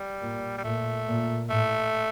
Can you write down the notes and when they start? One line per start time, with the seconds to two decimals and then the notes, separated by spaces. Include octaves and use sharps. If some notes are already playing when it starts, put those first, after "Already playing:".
Already playing: G3
0.22 A#2
0.58 G3
0.64 A#2 A3
1.08 A#2
1.50 A2 A3